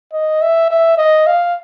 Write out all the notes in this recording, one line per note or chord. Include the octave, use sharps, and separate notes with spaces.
D#5
E5
E5
D#5
F5